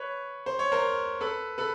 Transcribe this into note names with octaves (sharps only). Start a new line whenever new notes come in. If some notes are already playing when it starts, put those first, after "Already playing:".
Already playing: B4 C#5
C5
C#5
A#4 C5
A4 B4
A4 B4